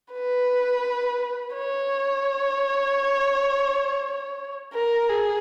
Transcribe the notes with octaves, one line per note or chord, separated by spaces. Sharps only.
B4
C#5
A#4
G#4